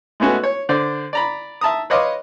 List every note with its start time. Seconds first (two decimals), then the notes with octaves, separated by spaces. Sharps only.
0.20 G#3 A3 B3 C#4 F#4
0.43 C#5
0.69 D3 C5 D5
1.13 D5 A#5 B5
1.61 E5 A5 A#5 D#6
1.90 B4 C#5 D#5 F5 C6 D6